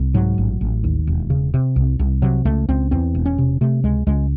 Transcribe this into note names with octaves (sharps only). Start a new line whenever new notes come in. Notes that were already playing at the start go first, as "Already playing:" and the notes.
Already playing: C2
G#2 F#3
A1
A1
D#2
E1
C#3
C3
C2
C2
C3 F#3
C#2 A3
C#2 C4
E2 C4
E1
C#4
C3
C3 A3
C#2 G#3
C#2 G#3